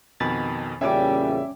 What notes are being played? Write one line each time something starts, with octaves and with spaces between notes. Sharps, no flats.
F2 B2 D#3 G#5 B5 A6
E2 A#2 C#3 G3 C#4 E5 G#5 D6